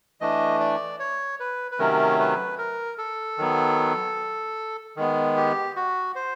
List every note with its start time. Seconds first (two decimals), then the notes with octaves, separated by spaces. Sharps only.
0.21 E3 A3 D4 D#5
0.60 D5
1.00 C#5
1.40 B4
1.71 B4
1.79 C3 D#3 F#3 A3 C#4 A#4
2.19 B4
2.58 A#4
2.98 A4
3.38 D#3 F#3 B3
4.96 D#3 G#3 B3
5.37 G4
5.76 F#4
6.15 C5